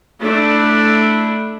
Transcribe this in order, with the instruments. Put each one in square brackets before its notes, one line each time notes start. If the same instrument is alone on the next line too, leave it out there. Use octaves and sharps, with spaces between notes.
[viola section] A3 D4 E4